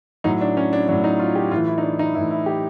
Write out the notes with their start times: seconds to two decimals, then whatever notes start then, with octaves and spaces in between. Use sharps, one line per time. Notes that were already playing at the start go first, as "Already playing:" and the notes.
0.24 A2 F#3 D#4
0.41 D4
0.57 C#4
0.73 D4
0.88 A2 F#3 D4
1.04 D#4
1.19 F4
1.35 G4
1.51 A2 E3 F4
1.67 E4
1.78 D#4
1.82 D4
1.99 D#4
2.14 A2 E3 E4
2.31 E4
2.46 G4